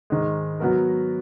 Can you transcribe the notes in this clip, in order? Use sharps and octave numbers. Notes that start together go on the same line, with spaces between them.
G#2 D#3 G#3
F#3 B3 F#4 A#4